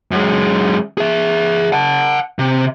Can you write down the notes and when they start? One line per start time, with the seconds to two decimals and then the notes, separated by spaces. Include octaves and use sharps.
0.11 F#2 G#3
0.98 G#4 E5
1.72 F#5 A5
2.39 C3